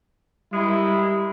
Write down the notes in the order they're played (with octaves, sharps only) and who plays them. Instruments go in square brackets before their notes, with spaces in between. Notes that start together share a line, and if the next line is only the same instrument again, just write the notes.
[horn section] D#3 G#3 E4 [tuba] G3